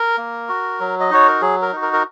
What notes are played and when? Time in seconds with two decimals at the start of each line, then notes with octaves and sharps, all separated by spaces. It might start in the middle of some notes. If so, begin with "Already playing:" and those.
Already playing: A#4
0.18 A#3
0.49 F#4
0.80 F#3
1.00 D#5
1.10 D#4 F#4 C#5
1.28 A#4
1.41 F#3 G#4
1.62 A#4
1.72 D#4 F#4
1.82 A#4
1.93 A#4